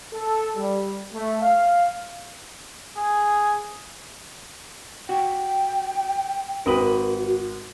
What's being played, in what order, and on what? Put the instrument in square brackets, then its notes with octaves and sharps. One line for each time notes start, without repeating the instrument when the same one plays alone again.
[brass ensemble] A4
G3
A3
F5
[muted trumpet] G#4
[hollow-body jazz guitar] F#4 [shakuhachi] G5
[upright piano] G#1 D#6 F#7 [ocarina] F#4 [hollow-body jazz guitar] A#4 B4